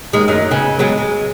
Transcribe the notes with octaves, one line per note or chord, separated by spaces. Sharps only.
D#2 G#3
F#2 F#3 D#4
C#3 B3
F#3 G#3 B3
G#3